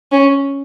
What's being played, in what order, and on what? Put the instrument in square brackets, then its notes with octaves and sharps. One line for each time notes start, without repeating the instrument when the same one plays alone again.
[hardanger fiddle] C#4